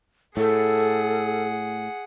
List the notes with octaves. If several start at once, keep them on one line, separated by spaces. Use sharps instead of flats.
A2 G#4 A4 F#5